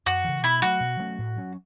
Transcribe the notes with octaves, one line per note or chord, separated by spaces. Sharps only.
F#2 F#4
C#3 E3
B2 E4
F#3 A3 F#4
B2
F#3 A3 C#4
A2
F#3 C#4